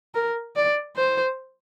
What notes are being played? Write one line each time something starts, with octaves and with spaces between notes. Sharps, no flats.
A#4
D5
C5